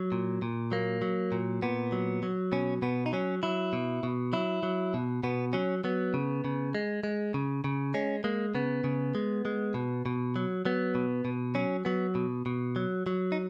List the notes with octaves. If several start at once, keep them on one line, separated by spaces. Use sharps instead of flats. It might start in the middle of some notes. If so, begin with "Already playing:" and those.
Already playing: F#3
A#2
A#2
F#3 A#3
F#3
A#2
A#2 B3
F#3
F#3
B2 C#4
B2 B3
D#4
F#3 C#4
F#3 E4
B2
B2
F#3 E4
F#3
B2
B2 B3
F#3 C#4
F#3 B3
C#3
C#3
G#3
G#3
C#3
C#3
G#3 C#4
G#3 A#3
C#3 B3
C#3
G#3
G#3
B2
B2
F#3
F#3 B3
B2
B2
F#3 C#4
F#3 B3
B2
B2
F#3
F#3
D#4